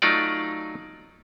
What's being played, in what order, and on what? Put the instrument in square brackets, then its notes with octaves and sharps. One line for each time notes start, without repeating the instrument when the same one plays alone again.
[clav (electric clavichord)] F#3 A3 D#4 F4 D5